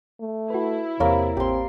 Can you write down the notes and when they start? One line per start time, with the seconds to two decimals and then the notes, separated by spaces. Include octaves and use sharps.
0.21 A3
0.50 E4 F#4 B4
1.00 E2 C3 A#3 A#4 C#5 D5 F5
1.37 A1 C4 G4 C6